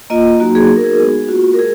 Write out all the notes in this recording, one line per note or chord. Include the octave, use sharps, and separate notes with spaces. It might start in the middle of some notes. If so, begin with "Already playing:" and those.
A#3 F4 D#5
F#3 A#3 D#4 F#4
G#4
B3 D#4 F#4
A#4
G#4
G#3 B3 D#4 F#4
A#3 F4 F#4
A#4
G#3 G#4